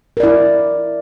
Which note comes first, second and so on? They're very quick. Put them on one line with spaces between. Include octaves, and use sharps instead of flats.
A#4 D5 E4